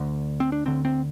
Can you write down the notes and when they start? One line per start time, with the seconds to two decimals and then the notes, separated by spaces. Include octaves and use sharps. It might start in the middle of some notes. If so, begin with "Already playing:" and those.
Already playing: D2 D3
0.40 C4
0.52 D4
0.66 D2 D3 C4
0.85 C4